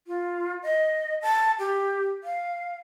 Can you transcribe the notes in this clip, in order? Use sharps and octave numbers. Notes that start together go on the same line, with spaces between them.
F4
D#5
A5
G4
F5